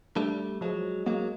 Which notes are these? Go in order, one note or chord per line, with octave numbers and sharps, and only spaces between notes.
G3 A3 D4
F3 F#3 G#3
F#3 G#3 A#3